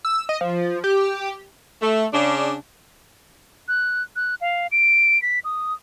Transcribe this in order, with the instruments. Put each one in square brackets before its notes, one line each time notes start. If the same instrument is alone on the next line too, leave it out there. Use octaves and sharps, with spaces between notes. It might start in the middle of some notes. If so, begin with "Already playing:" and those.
[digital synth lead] E6
D#5
F3
G4
[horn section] A3
C#3 D4
[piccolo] F#6
F#6
F5
D7
B6
D#6